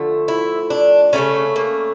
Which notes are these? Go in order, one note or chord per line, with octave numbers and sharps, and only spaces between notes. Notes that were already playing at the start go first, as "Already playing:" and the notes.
Already playing: D3 F3 A3
E4
D4
C#3 E3 A3 C#4
A#3